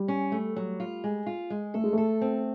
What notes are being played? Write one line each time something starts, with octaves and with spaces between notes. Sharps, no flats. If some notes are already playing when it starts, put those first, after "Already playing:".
Already playing: G3
C#4
A3
F#3
F4
G#3
F4
G#3
A3 A4
G#3
A3 A4
C4